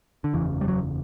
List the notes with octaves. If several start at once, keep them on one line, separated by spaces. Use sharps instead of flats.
D3
F#1 E2 C#3 E3
G3
F#3